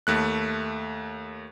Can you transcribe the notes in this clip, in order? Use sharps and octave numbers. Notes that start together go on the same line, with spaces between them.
D#2 A3 F#6